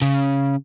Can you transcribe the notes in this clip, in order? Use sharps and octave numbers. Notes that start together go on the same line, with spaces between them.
C#3